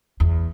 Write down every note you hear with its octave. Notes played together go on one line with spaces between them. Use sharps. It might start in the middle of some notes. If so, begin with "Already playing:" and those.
E2